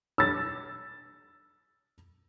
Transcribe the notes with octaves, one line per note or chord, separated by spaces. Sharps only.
E6 A6